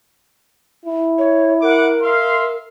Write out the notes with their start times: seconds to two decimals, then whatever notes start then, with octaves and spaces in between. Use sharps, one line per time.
0.85 E4
1.18 C#5
1.62 A#4 F#5 D6
2.01 E5 F5 C6